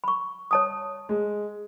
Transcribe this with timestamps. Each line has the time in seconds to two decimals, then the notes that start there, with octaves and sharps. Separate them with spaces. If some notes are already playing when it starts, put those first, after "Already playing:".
0.04 B5 C#6
0.51 C#5 A5 D#6
1.09 G#3